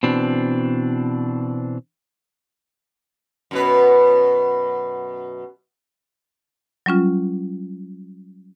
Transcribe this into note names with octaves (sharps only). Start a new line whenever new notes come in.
B2 E3 C4 D4
F#2 B2 B4
F#3 G3 C#4 F4